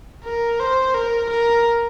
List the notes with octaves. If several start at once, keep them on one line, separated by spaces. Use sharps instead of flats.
A#4
C5
A#4
A#4